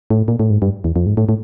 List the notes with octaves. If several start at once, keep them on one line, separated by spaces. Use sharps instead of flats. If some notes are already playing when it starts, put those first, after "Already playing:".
A2
A#2
A2
G#2
G2
E2
F2
G#2
A2
A2